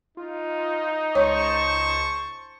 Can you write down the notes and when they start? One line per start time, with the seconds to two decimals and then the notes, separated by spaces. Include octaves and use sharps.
0.17 D#4 F4
1.15 C#2 C5 C#5 A5 C#6